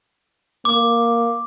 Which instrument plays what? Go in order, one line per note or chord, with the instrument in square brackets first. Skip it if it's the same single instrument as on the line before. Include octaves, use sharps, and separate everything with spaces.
[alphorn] A#3 [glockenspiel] D6